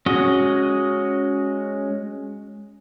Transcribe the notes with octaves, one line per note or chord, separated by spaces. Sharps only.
G#3 C#4 F#4 D#5